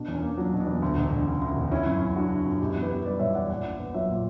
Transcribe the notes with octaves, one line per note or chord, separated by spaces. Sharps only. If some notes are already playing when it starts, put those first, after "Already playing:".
Already playing: B2 D4
E2
C#4
A#3
F#3 D4
B2
D4
E2
D2
E1
E1
C#3
D2
E1
C#3 C#4 E4
F#2
F#2
F#3 D4 F#4
C#3
F#2
B2 E4 G4
E2
G4 B4
B3
G3 B4 D5
B2 C#5 E5
E2 D5 F#5
A#2 D5 F#5
A#1
B3
F#3 C#5 E5
A#2